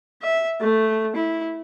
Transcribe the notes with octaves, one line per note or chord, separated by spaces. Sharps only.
E5
A3
E4